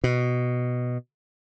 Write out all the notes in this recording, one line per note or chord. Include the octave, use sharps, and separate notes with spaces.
B2